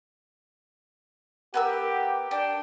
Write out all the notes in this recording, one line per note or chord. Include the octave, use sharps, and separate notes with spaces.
B3 G4 A#4 E6
D4 G5